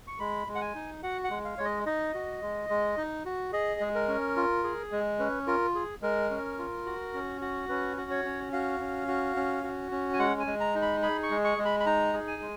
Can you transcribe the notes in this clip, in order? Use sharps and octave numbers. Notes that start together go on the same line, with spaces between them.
C#6
G#3 B5
G#3
F#5
G#5
D#4
F#4 F#5
F#5
G#3
F5
G#3 C#5
D#5
D#4 D#5
F#4
G#3
G#3
D#4
F#4
G#4 D#5
G#3
A#4
C#4
F4
G#4
G#3
C#4 B4
F4 A#4
G#4
G#3 A#4
C#4
F4
F#4
C#4
F#4
C#4 B4
F#4
C#5
C#4
F#4 F5
C#4
F#4
C#4
F#4
C#4
G#5
G#3 F#5
G#5
G#3
A#5
D#4
B5
G#4 B5
C#6
G#3
C#6
G#3
B5
B5
D#4 A#5
G#4
G#5
G#3